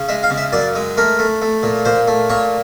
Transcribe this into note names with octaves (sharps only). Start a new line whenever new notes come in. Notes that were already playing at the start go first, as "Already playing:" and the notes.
Already playing: C#3
G#3 E5
F5
C#3
E5
F#2 D5
G#3
A3 A#4
A3
A3
A#2
A#2 C5
A3
A#2 C#5